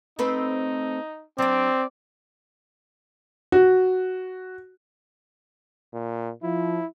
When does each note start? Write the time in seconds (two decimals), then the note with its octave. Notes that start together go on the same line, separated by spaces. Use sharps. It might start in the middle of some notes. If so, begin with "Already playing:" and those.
0.19 A3 C4 D#4 B4
1.38 F#3 C4 D4 D5
3.52 F#4
5.93 A#2
6.43 F3 E4